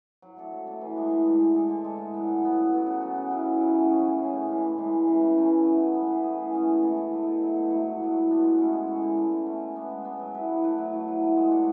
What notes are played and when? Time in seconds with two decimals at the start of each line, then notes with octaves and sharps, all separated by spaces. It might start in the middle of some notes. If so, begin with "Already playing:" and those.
0.22 F#3
0.37 A3 D4 A4
0.52 F#3
0.66 A3 D4 A4
0.81 E3
0.96 G#3 D4 G#4
1.11 E3
1.26 G#3 D4 G#4
1.40 D3
1.55 G#3 D4 A4
1.70 D3
1.84 G#3 D4 A4
1.99 A2
2.14 F#3 B3
2.28 A2
2.43 F#3 B3
2.57 C#3
2.72 F#3 B3 F#4
2.86 C#3
3.01 F#3 B3 F#4
3.15 C#3
3.30 F#3 C#4 E4
3.45 C#3
3.60 F#3 C#4 E4
3.75 A3
3.89 C#4 G#4
4.04 A3
4.19 C#4 G#4
4.33 A2
4.48 E3 G#3 D4
4.62 A2
4.78 E3 G#3 D4
4.92 C#3
5.06 E3 A3 C#4
5.21 C#3
5.36 E3 A3 C#4
5.50 F#3
5.65 B3 E4
5.80 F#3
5.95 B3 E4
6.09 E3
6.23 A3 C#4 G#4
6.39 E3
6.53 A3 C#4 G#4
6.68 D3
6.82 A3 E4 A4
6.97 D3
7.12 A3 E4 A4
7.26 B2
7.41 F#3 A3 E4
7.56 B2
7.71 F#3 A3 E4
7.85 A2
7.99 F#3 B3 D4
8.14 A2
8.29 F#3 B3 D4
8.44 G#3
8.58 C#4 E4 A4
8.73 G#3
8.88 C#4 E4 A4
9.02 D3
9.17 A3 C#4
9.32 D3
9.46 A3 C#4
9.61 G#3
9.76 B3 D4
9.90 G#3
10.05 B3 D4
10.19 F#3
10.34 A3 E4 B4
10.49 F#3
10.64 A3 E4 B4
10.78 F#3
10.93 A3 E4
11.08 F#3
11.22 A3 E4
11.37 G#3
11.51 D4 F#4 A4